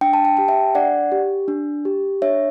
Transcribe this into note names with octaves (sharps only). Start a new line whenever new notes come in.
D4 G5
A5
G5
G4 A5
E5 G5
D4 D5 F#5
G4
D4
G4
D4 C#5 E5